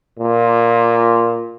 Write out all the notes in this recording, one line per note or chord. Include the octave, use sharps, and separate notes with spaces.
A#2